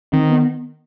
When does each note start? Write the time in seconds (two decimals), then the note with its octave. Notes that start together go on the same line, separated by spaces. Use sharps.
0.13 D#3 C4
0.30 B3